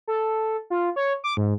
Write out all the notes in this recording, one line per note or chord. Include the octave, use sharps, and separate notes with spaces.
A4
F4
C#5
D6
G#2